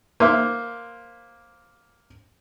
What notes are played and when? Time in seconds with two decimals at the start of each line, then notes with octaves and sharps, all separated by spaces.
0.20 A#3 C5 E5